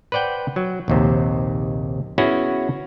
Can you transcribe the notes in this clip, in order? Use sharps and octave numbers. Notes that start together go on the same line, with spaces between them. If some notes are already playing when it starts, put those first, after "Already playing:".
B4 C5 D5 F#5 G5
F#3
A#1 D#2 C3
B3 C#4 E4 F#4 G#4